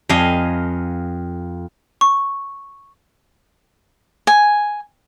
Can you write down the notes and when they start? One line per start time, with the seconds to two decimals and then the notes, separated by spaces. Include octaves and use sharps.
0.09 F2 D#5 F5 G#5
2.01 C#6
4.27 G#5